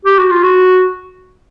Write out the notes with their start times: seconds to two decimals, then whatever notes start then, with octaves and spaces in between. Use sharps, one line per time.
0.05 G4
0.19 F#4
0.31 F4
0.43 F#4